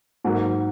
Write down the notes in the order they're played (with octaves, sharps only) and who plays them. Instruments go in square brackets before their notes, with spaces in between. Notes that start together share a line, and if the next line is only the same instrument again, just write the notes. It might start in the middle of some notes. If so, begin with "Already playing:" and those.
[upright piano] G#2 F#3 A#3